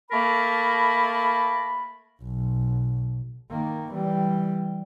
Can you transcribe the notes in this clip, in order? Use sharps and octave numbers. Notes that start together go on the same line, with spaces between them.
A3 A#3 A#4 A5 B5
B1
D#3 A#3
E3 G3